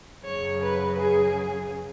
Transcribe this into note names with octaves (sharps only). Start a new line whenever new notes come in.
F#2 C#3 F#3 C#5
B4
G#4